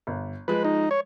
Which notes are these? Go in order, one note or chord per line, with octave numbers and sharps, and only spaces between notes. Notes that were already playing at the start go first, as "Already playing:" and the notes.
G1
F3 G#3 B4
D#4
C#5